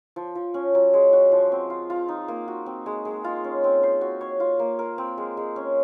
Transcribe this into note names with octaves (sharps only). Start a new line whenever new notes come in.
F3
F3
C#4
F#3
G#3
F#4
F3
C4
F4
F4
D#4
A#3
F#4
C4
G#3
G#3
F4
C#4
C4
C5
F#4
C#5
F4
A#3
A#4
C4
G#3
G#3
C#4